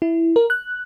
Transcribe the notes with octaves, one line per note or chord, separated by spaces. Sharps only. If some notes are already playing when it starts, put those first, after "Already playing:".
E4
A#4
F#6